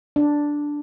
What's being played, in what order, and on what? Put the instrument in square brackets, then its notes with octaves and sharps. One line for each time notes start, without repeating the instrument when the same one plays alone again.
[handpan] D4